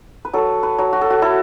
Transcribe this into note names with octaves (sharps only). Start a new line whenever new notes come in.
B4
F#3 A4
B4
F#3
F#4
A4
F#4
E4 A4